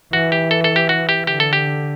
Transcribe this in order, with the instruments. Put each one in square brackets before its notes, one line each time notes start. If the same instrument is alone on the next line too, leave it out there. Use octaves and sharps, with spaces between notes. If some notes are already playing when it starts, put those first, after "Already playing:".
[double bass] E3 [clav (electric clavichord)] F#4
[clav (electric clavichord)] G4
A4
A4
G4
F#4
G4
[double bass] D3 [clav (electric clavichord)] G4
[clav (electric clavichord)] A4
G4